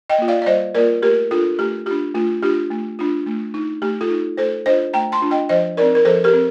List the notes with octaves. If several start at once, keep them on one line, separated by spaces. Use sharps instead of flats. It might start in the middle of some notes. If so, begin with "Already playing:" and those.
D#5 G5
A#3 F4
D5 F5
D5
G3 C5 D#5
A#3 F4 A#4 D5
A3 G4 A#4
D4 F4 A4
A3 G4
D4 F4 G4
A3 F4
D4 F4 G4
A3
D4 F4
A3
D#4
A3 G4
F4 A4
D#4
A3 A4 C5
D4 F4 C5 D#5
A3 G5 A#5
A5 C6
D4 F4
D#5 G5
F3 C5 D#5
C4 D#4 A#4 D5
A#4
F3 A4 C5
G4 A#4
C4